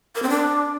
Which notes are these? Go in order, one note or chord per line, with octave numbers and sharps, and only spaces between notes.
A#4
C4
D4